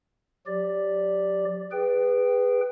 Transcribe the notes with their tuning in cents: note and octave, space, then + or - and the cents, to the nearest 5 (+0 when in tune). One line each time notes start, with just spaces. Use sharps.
F#3 -30 G4 +0 D5 +0
G#4 -25 B4 +5 G5 -5